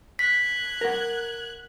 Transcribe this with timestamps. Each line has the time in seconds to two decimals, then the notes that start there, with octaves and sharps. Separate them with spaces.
0.19 F#6 G#6 B6
0.81 A#4 F#5